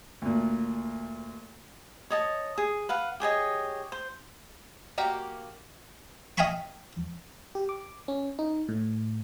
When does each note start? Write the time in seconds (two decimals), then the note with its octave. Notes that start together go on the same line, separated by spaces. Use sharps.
0.22 D2 A#2
2.10 C#5 D#5 A5
2.58 G#4
2.89 B4 F5 F#5
3.20 G4 G#4 C#5 D#5
3.92 C5
4.98 A#3 F#4 G4 F5
6.38 D#5 F5 G5 G#5 B5 C#6
7.55 G4
7.69 D6
8.08 C#4
8.39 D#4
8.69 A2